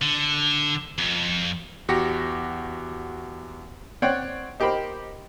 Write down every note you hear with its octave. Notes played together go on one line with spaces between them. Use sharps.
D3
F2
E2 F#4 G4 A#6 C#7
C4 C#5 D5 F#5 G5
D#4 G4 A#4 C5 B5